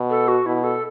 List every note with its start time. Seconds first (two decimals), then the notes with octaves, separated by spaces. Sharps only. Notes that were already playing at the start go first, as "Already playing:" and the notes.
Already playing: B2
0.10 A4
0.28 F#4
0.45 B2 E4
0.64 A4